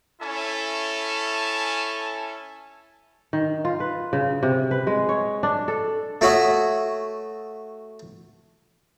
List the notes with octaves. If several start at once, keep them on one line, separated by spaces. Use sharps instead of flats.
C#4 E4 A4 E5 G#5 A5
D#3
F4
B4
C#3
C3
B4
G#3
C#5
D4
A4
A3 F#4 C#5 E5 D#6